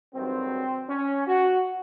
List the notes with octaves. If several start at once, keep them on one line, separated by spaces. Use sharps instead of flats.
G#1 G2 D#3 F#3 C4
C#4
F#4